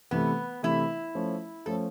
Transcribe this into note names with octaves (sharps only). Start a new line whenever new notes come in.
C3 E3 A3 B3
C3 E3 A3 E4
F3 A3 C#4
F3 A3 C#4 A4